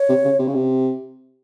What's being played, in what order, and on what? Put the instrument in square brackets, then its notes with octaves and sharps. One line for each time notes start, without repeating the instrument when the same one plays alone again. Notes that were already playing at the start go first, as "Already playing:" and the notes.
Already playing: [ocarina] C#5
[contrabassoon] C3
C#3
C3
C#3
C3